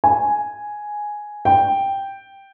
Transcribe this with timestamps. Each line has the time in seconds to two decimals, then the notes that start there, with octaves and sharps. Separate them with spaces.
0.04 G#5
1.45 G5